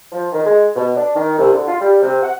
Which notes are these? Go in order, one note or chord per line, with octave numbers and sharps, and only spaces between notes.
F3
D#3
G#3
B2
D4
D#3
C2
D3
F4
G3
C3
F#5